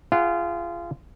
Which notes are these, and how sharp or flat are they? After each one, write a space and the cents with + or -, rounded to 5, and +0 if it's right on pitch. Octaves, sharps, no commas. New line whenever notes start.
F4 -25 G#4 +0 F#5 +0